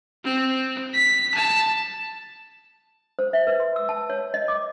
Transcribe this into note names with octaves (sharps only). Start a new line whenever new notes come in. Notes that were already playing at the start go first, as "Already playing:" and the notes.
C4
B6
A5
C5
E5
B4
C6
E6
A5
C#5
D#5
D6